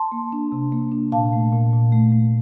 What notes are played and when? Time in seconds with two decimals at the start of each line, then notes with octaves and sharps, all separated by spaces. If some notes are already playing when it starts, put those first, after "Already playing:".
Already playing: A5 C6
0.12 A#3
0.32 D4
0.52 C3
0.72 A#3
0.92 D4
1.12 A#2 F5 A5
1.33 A3
1.52 A#2
1.73 A#2
1.92 A3
2.12 A3